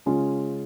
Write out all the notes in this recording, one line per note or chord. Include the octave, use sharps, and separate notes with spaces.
C#3 G#3 C#4 F4 G#4